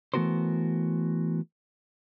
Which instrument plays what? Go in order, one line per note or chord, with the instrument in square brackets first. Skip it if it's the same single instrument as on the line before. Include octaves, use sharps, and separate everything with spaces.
[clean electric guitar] E3 A3 B3 F#4 A#4 C5